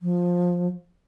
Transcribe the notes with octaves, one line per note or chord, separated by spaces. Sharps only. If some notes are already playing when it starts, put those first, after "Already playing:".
F3